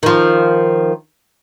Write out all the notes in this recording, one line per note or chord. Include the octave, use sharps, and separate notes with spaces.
D#3 F3